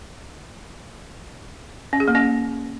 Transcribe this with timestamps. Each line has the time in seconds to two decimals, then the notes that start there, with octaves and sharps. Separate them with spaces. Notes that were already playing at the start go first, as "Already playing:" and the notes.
1.93 C#4
2.00 G#4
2.08 A#3
2.15 C#4